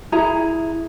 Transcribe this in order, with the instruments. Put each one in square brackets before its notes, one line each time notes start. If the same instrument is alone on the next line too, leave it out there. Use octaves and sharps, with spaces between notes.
[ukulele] E4 G#4 A#5